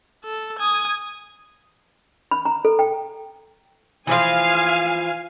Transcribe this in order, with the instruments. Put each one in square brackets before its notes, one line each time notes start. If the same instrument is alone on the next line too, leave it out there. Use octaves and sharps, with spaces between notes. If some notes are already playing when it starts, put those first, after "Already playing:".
[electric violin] A4
G#5 D#6
[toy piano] B5
A#5
A4
G5
[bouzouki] E3 F3 [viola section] F5 G#5